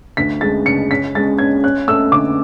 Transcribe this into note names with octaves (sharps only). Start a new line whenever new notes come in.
D2 B6
G#3 A6
C#3 C#7
C#4 B6
G#3 A6
C#4 G#6
C#4 F#6
A3 E6
D3 D6